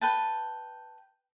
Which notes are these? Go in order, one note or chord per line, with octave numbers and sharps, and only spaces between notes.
B4 G5 A5